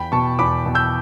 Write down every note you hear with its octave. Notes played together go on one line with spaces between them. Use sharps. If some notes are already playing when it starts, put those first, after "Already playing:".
Already playing: E2 G5 B5
B2 A5 C#6
E2 B5 D6
B2
E6 G6